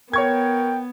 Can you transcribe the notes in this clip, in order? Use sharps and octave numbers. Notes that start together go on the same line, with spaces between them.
B3 A#4 C#5 G5 C#6 G#6